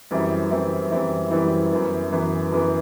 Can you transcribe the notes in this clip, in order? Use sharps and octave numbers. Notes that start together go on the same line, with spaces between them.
F#2 E3 G3 C4 E4
F#2 E3 G3 C4 E4
F#2 E3 G3 C4 E4
F#2 E3 G3 C4 E4
F#2 E3 B3
F#2 E3 B3
F#2 E3 B3